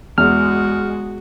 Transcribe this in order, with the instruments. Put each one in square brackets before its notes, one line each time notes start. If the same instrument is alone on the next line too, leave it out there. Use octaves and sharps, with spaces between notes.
[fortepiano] E2 [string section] G#3 [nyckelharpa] F#4 [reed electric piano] F6